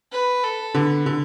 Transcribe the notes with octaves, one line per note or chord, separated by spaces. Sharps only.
B4
A4
D3 B3
D3